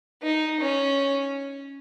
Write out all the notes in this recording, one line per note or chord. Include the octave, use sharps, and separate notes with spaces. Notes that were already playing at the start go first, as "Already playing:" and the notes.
D#4
C#4